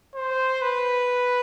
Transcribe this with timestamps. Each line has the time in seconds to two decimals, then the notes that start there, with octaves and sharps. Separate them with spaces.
0.15 C5
0.62 B4